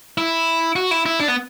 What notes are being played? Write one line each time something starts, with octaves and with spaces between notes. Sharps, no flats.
E4
F#4
E4
E4
D4
B3